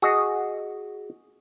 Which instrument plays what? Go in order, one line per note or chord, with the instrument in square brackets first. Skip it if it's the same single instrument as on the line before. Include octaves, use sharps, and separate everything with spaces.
[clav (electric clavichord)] F#4 G#4 D#5